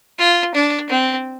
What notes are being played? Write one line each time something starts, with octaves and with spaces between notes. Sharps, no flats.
F4
D4
C4